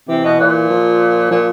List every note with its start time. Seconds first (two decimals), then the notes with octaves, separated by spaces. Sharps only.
0.09 C3 E3
0.24 B2
0.39 A#2
0.70 F3
1.31 A#2 F3